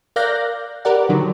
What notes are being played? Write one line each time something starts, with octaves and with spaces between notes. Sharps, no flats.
A#4 D5 F5 F#6 G6 A#6
G4 A#4 B4 D5 F#5
D3 D#3 F#3